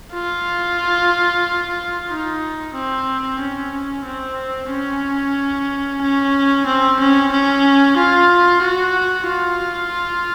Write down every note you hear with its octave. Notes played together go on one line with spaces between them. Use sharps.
F4
D#4
C4
C#4
C4
C#4
C#4
C4
C#4
C#4
F4
F#4
F4